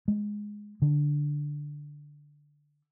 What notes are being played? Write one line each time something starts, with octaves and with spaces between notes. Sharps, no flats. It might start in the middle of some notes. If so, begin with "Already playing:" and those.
G#3
D3